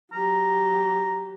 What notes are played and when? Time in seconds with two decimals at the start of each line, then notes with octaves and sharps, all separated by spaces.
0.13 F#3 G4 A#5